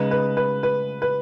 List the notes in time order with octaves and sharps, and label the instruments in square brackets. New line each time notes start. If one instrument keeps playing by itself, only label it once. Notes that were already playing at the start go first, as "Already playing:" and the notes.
Already playing: [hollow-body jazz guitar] C#3 G#3 D#4 [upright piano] B4
[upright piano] B4
B4
B4
B4